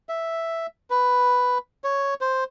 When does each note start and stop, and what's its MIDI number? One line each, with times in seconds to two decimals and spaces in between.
0.09 0.67 76
0.90 1.58 71
1.84 2.14 73
2.21 2.44 72